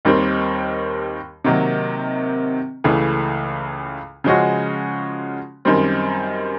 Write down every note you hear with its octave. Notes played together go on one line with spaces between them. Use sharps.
D#2 D#3 G3 C4
C3 D#3 F#3 A#3
C#2 C#3 E3 A3
C#3 F3 G#3 C#4 F#4
F#2 D#3 G3 C4